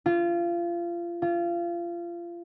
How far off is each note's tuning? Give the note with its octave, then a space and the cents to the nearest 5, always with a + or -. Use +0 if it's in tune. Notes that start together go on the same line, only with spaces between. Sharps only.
F4 -25
F4 -25